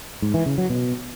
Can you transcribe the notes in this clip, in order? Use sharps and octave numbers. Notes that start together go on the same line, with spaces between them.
G#2
E3
C#3
F#3
B2